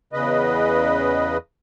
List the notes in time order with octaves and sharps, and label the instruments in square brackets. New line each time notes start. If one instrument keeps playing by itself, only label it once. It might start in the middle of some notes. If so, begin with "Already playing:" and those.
[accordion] E2 C#3 B4 D#5